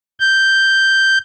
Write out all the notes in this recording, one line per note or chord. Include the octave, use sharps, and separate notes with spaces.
G6